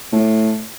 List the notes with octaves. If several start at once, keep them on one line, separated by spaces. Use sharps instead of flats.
A2